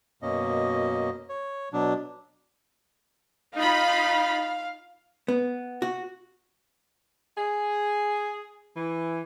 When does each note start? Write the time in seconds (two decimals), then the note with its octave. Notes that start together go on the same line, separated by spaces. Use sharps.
0.22 F#2 B2 A#3 C#4 D#5
1.29 C#5
1.73 B2 F#3 D4
3.55 D#4 F4 F5 B5
5.28 B3
5.82 F#4
7.38 G#4
8.77 E3